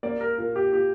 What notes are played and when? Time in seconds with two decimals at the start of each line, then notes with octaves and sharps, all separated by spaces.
0.03 A#3 D5
0.21 A#4
0.38 A#2 A#4
0.56 G4
0.73 A#2 G4